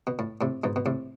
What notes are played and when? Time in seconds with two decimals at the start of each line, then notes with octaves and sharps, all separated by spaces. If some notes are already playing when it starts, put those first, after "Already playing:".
0.07 B2
0.19 A2
0.41 A2 C3
0.64 G#2 B2
0.76 B2
0.86 A2 C3